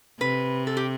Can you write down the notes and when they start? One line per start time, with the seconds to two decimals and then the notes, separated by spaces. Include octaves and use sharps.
0.20 C3 B4
0.67 A4
0.77 G4